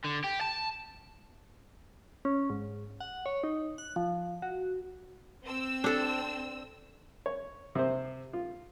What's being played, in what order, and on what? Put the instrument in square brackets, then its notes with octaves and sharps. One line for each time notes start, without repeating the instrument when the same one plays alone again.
[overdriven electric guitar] D3
G4
A5
[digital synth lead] C#4
G#2
F#5
C#5
D#4
F#6
F3
F#4
[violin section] C4 E6
[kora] D4 A4
[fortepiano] C#5
C3 C5
F4